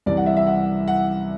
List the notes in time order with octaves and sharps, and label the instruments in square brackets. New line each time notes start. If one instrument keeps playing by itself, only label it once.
[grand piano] C2 C3 E3 D5
F#5
E5
E5
F#5
F#5